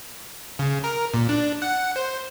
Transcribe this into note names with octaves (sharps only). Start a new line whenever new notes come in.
C#3
A#4
A#2
D4
F#5
C5